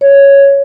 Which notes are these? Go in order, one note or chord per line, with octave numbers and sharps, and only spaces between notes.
C#5